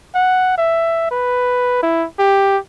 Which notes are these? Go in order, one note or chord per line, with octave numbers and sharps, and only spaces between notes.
F#5
E5
B4
E4
G4